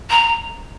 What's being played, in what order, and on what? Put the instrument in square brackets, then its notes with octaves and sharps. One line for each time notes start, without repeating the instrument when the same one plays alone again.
[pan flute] A#5